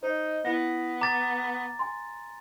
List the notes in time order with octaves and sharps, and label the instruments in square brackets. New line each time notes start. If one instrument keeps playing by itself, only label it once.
[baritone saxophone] D#4 [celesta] C5 D#5
[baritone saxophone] B3 [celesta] E4 A#6
[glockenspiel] A#5 A6 [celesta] D6
[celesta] G#5 C6